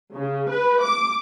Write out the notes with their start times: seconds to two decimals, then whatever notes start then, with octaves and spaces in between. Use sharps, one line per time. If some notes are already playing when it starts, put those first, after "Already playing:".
0.14 C#3
0.50 B4
0.82 D6